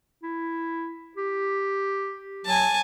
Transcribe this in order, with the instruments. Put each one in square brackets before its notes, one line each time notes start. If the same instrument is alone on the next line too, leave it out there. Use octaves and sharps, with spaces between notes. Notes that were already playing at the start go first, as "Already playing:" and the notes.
[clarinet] E4
G4
[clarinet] F#3 [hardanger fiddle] G#5 A5